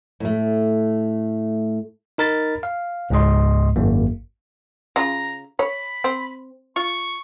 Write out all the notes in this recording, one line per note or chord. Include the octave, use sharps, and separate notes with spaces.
A2 A3
D#4 A#4 B5 A6
F5
C#2 G#2 G#3 D#5 C6
G#1 F#2 A#3
C#3 F4 A#5
C#5 B5
C4
F4 C#6